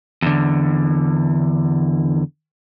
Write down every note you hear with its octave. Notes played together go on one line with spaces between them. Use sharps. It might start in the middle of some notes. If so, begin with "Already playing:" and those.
E2 D3